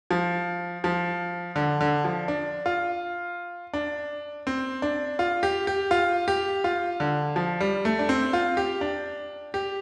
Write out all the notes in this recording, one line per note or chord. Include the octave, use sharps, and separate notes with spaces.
F3
F3
D3
D3
F3
D4
F4
D4
C4
D4
F4
G4
G4
F4
G4
F4
D3
F3
G3
A3
D4
C4
F4
G4
D4
G4